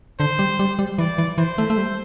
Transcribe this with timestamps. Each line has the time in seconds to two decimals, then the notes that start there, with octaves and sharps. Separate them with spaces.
0.19 D3 C5
0.39 G3
0.59 G3
0.79 G3
0.98 E3 D5
1.18 E3
1.38 E3 C5
1.58 A3
1.70 A3
1.77 G3